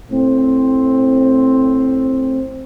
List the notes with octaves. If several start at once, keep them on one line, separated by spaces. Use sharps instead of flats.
A2 C4